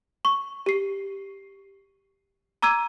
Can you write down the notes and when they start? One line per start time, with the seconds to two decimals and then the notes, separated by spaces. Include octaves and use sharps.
0.25 C#6
0.66 G4 C7
2.63 A#5 D6 E6 G#6 D#7